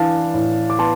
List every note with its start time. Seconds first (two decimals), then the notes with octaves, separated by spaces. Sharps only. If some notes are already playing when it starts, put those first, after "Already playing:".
Already playing: E3 D4 F5 A5
0.34 A2
0.70 D6
0.79 B3 A5 C6